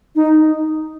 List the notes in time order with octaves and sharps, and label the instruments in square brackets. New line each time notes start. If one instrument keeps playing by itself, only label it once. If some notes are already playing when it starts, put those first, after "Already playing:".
[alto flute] D#4